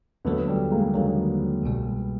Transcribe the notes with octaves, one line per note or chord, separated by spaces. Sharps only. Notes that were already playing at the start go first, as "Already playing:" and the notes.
D#2 D3 F#3 A3 B3
G3 A3
G#3 A#3
D#2 D3 F#3 G#3 A#3
C2 B2 G3